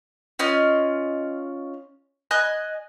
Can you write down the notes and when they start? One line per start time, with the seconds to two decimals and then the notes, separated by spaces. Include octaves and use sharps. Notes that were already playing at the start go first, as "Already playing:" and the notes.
0.39 C#4 F4 D#5 F6
2.31 D#5 G#5 F#6